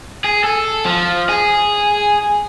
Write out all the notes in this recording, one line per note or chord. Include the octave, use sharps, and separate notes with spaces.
G#4
A4
F3
G#4